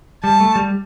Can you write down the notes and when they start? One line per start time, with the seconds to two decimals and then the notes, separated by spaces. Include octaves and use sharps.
0.24 G3 A5
0.40 A3
0.56 G3